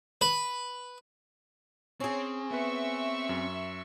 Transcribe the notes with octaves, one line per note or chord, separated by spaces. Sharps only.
B4
C4 C#4 G#4
B3 B4 E5 C#6 E6
F#2